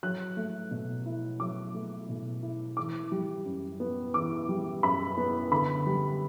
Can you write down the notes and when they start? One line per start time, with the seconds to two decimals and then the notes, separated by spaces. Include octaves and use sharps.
0.03 F#3 F#6
0.37 A3
0.71 B2
1.06 E4
1.40 F#3 D6
1.74 A3
2.09 B2
2.43 E4
2.77 E3 D6
3.12 G3
3.45 F#2
3.80 B3
4.14 E3 D6
4.49 G3
4.83 F#2 B5
5.17 B3
5.51 D3 B5
5.86 G3